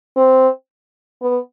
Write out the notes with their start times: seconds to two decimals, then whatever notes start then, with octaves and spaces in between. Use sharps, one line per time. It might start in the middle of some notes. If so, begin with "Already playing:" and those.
0.16 C4
1.22 B3